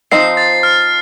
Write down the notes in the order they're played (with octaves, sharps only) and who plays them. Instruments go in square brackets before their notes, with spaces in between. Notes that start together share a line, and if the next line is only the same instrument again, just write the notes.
[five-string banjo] F3 C4 D#4 [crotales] C7
[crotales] A6
F6